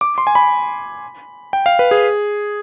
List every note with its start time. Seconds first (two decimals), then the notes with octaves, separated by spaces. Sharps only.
0.01 D6
0.18 C6
0.27 G#5
0.35 B5
1.53 G5
1.66 F5
1.79 B4
1.91 G#4